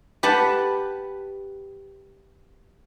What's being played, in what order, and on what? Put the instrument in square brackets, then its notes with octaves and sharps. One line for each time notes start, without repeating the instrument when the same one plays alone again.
[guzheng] G4 B4 F#5 A5